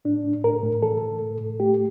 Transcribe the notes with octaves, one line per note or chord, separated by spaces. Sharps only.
A2 D4
A2
A2 A#4
A2
E3 A4
A2
A2
A2
A3 G4